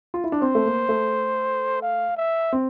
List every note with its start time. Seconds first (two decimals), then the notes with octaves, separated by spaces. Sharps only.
0.14 F4
0.24 E4
0.32 D4
0.41 C4 C5
0.55 A3
0.66 A#3
0.89 A3
1.82 F5
2.17 E5
2.53 C4